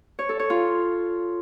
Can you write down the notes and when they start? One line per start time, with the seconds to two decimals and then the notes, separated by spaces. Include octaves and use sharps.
0.19 C#5
0.29 A4
0.39 C#5
0.50 F4